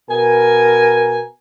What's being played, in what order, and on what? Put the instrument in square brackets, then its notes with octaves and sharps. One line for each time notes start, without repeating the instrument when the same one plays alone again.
[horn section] B2 G#5 [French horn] A#4